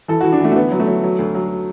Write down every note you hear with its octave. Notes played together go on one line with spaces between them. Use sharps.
E3 A4
E3 F#4
D4
E3 A3
A3
D3 B3
F#3
A3
F#3
F#3
D2
F#3